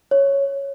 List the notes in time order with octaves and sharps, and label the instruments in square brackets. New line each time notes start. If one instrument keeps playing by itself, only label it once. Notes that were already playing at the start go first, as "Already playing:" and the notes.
[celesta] C#5